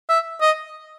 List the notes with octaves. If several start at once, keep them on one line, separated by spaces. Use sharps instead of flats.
E5
D#5